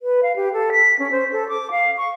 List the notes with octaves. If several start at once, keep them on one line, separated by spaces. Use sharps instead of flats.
B4
F5
G4
A4
B6
C#4
C5
A4
D6
F5
C#6